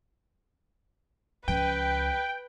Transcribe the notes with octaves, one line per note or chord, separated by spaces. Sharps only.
C#2 F3 B4 G5